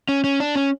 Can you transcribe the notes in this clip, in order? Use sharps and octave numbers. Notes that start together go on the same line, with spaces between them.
C#4
C#4
D4
C#4